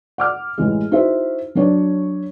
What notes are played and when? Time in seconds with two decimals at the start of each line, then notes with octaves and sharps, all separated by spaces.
0.18 F#5 D6 F6
0.58 A1 E3 G#3
0.91 D#4 E4 F#4 G#4 C5 E5
1.55 F#3 D4 C#5